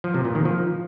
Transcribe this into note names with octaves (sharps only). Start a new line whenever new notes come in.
F3
C3
A#2
D#3
F3